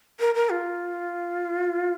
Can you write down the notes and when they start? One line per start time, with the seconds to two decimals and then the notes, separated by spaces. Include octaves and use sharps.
0.20 A#4
0.35 A#4
0.50 F4